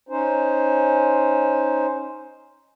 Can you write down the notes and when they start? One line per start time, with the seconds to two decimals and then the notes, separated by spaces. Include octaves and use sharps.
0.09 C#4 D#4 C5